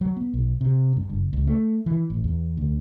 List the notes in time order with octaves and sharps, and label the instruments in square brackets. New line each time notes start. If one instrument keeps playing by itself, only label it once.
[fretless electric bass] F#3
B3
B1
C3
G2
F#1
C#2
A3
E3
A1
E2
D2